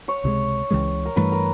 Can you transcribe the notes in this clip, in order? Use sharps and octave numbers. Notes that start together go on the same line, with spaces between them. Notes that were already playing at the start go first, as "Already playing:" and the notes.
C#5
C#2 C3 D#3 G#3
C#2 C#3 E3 G#3
A#4
G2 E3 A3 B4
A#4